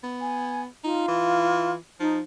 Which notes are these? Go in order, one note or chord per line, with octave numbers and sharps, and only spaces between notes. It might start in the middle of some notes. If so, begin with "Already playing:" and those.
B3
G#5
D#4 F4
E3
F3 D#4